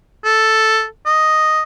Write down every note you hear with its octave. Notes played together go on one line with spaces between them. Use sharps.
A4
D#5